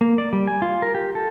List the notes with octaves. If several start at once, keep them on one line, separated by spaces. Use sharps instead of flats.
A#3
D5
G3
G#5
F4
A#4
G4
A4